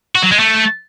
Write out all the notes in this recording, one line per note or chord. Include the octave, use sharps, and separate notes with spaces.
F#4
F#3
G#3
A3